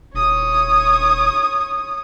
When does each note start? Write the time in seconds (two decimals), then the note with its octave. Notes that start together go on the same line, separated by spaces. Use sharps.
0.15 D#1 C#5 D#6